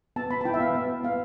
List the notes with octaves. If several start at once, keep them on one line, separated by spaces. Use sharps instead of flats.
B3 A5
B3 B5
A5
E4 G5
E5
B3 F5
B3 E5
B3
B3 F5